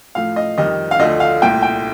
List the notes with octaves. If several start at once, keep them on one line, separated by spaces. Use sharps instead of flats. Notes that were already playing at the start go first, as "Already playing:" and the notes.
A2 F3 A3 F5
D#5
F2 D#3 G3 D#5
F5
D2 D3 F3 A3 D#5
F5
C2 A#2 A3 G5
G5